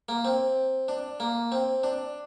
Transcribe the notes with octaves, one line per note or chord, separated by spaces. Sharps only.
A#3
C4
D4
A#3
C4
D4